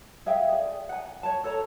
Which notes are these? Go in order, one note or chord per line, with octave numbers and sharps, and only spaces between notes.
G#4 E5 F5 G5
G#4 D5
F#5 G#5
C#5 A5
A4 C#5 A#5